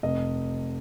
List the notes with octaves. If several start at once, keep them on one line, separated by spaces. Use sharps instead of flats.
F1 D#5